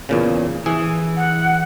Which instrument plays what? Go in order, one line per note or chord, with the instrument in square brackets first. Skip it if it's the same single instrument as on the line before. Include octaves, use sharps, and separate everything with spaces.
[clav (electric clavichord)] E2 A#2 C#3
[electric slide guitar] E3 [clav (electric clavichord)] G#4
[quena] F#5